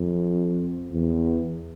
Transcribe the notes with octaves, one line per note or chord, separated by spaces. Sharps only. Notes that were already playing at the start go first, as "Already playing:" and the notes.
Already playing: F2
E2